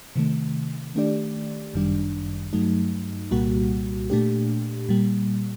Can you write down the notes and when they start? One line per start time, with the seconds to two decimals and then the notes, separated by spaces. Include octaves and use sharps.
0.16 C3 D#3 A3
0.95 D#3 A3 D4 G4 D5
1.74 G1 F#2 D#3 G3 D4
2.53 G2 F#3 A3 D#4
3.31 C2 A#2 G3 A#3 F#4
4.10 A#2 A3 D4 G4
4.89 A#2 G3 A#3